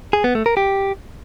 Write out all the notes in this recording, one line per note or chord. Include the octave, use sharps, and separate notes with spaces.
G#4
B3
A3
A#4
G4